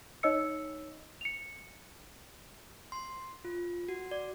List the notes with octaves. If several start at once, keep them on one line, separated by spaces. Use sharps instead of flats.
D#4 C#5 D#5 E6 C#7
C#7 F7
C6
F4
F#4
D5